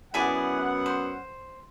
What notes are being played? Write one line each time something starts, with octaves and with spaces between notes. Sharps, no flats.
F#2 B3 E4 G#4 D5 F#5
C5